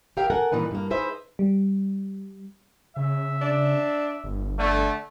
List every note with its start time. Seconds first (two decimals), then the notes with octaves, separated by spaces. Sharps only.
0.17 G4 A#4 E5 F5 G5
0.30 A4 A#4 F#5 G#5
0.52 G2 A#2 E3 D#4 B4
0.71 G2 A#3
0.90 D#4 G#4 B4 C5 E5
1.39 G3
2.96 C#3 E5
3.41 D4
4.24 G1
4.59 D3 A3